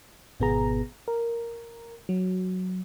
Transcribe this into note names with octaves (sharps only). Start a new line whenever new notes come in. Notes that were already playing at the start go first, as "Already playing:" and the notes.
G#1 B2 B3 G#4 A#5
A#4
F#3